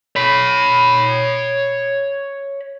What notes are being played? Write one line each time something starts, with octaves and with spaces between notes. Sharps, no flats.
C#5 B5